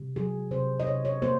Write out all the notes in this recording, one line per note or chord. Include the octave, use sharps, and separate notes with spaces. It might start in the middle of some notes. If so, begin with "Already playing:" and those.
Already playing: C3
F#3 G#4
C3 C5
D#5
C3 C#5
C#5
A#3 C5